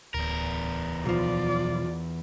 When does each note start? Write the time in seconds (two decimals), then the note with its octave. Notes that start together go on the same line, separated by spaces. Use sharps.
0.14 D1 E2 A#4
1.06 B1 F3 F4 D5